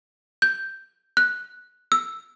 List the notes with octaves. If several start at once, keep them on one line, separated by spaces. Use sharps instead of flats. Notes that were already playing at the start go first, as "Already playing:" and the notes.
G6
F#6
E6